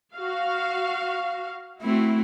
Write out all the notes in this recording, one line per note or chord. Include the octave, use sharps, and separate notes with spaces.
F#4 F5
A3 C4 E4 F#4